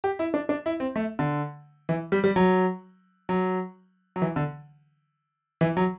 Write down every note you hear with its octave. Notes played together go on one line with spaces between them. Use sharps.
G4
E4
D4
D4
E4
C4
A3
D3
E3
G3
G3
F#3
F#3
F#3
E3
D3
E3
F#3